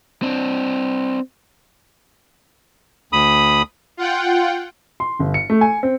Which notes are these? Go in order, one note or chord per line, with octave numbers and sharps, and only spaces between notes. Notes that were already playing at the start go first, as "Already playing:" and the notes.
C4 D4
D2 B5 D#6
F4 F#5 G5
C6
G1
C#7
A3
G#5
C4